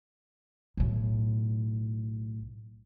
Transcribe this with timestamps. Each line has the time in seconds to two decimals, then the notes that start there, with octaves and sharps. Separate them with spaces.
0.77 B1 A2